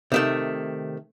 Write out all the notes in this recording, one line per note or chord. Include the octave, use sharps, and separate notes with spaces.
C3 D#3 A3